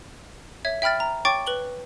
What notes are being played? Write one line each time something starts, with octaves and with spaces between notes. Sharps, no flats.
C#5 E5 G#6
E5 G5 B5 F6 A6
A#5
C#5 G5 C#6 D6 A6
B4 F#7 G7